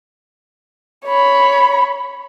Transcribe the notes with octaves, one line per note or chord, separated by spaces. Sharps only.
C#5 B5